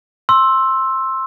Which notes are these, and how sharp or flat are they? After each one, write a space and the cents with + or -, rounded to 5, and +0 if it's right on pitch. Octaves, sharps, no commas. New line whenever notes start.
C6 +15 E6 +0